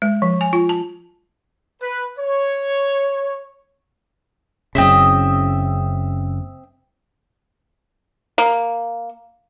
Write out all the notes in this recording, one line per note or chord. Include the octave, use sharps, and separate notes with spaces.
G#3
F3
G#5
F4
A5
B4
C#5
F#1 C#3 C4 D#5 E5
A#3